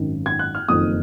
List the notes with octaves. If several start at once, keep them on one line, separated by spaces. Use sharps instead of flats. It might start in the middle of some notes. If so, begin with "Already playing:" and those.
Already playing: G#1 F#2 D#3
G#6
F#6
F6
F#1 F2 D#3 D#6